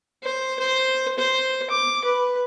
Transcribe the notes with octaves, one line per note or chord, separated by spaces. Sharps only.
C5
C5
C5
D6
B4